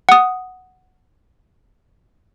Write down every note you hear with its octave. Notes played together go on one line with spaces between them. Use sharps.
F#5 D#6